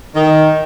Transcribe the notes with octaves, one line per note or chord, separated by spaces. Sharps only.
D#3